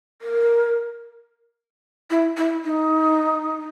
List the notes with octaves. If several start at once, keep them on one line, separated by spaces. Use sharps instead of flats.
A#4
E4
E4
D#4